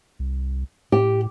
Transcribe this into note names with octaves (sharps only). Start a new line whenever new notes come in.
C2
A2 G4